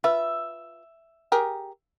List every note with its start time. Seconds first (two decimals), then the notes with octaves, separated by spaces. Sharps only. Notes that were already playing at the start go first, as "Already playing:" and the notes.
0.04 F4 B4 E5
1.32 G4 G#4 A#4